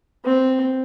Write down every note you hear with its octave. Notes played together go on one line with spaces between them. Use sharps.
C4